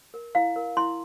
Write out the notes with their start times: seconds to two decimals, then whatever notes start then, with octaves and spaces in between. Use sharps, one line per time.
0.14 A#4
0.35 E4 F5
0.56 A#4
0.77 E4 C6